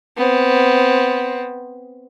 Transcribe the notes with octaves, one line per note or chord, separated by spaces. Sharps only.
B3 C4